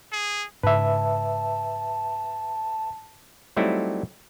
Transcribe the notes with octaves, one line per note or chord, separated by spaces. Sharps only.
G#4
G#2 C#3 B4 E5 A5
F#3 G3 A3 C4 D#4 E4